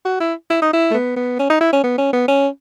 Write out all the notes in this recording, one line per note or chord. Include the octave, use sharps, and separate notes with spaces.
F#4
E4
E4
D#4
E4
A3
B3
B3
C#4
D#4
E4
C#4
B3
C#4
B3
C#4